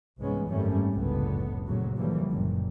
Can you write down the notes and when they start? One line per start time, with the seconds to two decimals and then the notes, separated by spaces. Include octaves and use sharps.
0.18 C2 G#2 E3 G#3 B3 C#4
0.47 G#1 F#2 G3 A3 C#4
0.92 F#1 C#2 A2 D3 B3
1.66 D2 A#2 C#3 F#3
1.95 D#2 D3 E3 F3 G3
2.31 F#1 F#2 A#2